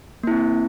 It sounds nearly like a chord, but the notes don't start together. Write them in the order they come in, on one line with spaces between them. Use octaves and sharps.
A#3 E4 C4